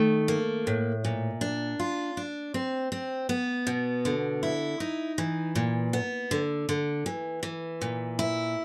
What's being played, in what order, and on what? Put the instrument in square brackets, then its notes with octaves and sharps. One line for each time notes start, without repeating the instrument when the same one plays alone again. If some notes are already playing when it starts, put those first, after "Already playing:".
Already playing: [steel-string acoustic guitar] D#3 A3
A#3
A2
A#2
D4
F4
D4
C4
C4
B3
B2
D3
E4
D#4
E3
A#2
B3
D3
D3
E3
E3
A#2
E4